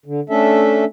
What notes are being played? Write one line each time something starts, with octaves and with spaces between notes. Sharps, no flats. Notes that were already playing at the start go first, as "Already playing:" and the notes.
D3
A3 C#4 D4 A4 E5